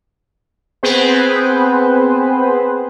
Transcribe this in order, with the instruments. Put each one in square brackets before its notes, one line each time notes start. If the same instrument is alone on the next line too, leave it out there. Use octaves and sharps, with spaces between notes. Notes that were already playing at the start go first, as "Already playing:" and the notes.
[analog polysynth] B3 C4 G#4 B4 C5